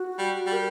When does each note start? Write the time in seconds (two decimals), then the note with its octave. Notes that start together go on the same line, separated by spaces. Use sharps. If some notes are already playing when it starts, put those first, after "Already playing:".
Already playing: F#4
0.19 G3
0.47 G3
0.52 A#4